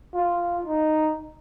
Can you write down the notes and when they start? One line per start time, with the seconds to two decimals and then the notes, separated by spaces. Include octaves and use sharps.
0.14 F4
0.65 D#4